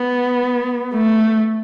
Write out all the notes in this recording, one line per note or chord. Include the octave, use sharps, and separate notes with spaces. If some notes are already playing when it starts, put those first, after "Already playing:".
Already playing: B3
A3